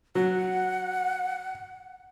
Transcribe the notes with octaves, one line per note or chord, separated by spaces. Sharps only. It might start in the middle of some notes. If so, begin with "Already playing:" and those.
F#3 F#5